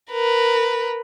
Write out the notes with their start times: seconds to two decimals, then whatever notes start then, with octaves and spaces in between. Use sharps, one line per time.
0.11 A#4 B4